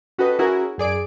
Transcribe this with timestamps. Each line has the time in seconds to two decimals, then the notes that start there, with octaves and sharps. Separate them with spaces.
0.18 C#4 F#4 G4 A4 B4 D#5
0.39 C#4 E4 F#4 G#4 A#4
0.78 F#2 G#4 D5 D7